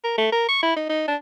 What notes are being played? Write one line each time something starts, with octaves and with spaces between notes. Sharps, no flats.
A#4
A3
A#4
C#6
E4
D#4
D#4
D4